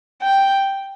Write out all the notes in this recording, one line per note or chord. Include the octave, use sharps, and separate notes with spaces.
G5